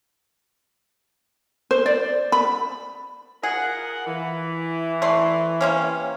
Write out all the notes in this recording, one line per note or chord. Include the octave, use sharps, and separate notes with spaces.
C5
D5
B5
F4 G#4 A#4 F#5
E3
A3 D5 C6
C3 A#3 C#4